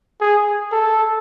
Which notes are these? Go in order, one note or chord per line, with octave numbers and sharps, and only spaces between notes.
G#4
A4